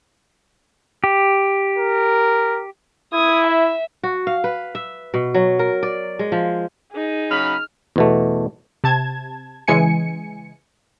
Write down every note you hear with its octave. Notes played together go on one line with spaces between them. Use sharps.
G4
A#4
E4 D#6 G#6
E5
F#4
F5
B4
E5
B2
F#3
A#4
D5
G#3
F3
D#4 G#4
C#3 F#3 B5 F6
E2 B2 A3
C3 A5 G#6
C#3 E3 G#3 G#5 C#7